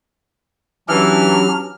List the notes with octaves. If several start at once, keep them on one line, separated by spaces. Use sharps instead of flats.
E3 F#3 C#4 D4 G4 F6